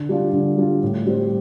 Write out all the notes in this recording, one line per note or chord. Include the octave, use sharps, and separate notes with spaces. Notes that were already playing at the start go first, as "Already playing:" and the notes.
Already playing: D3
G3 D4 F4
D3
G3 D4 F4
A2
G3 C4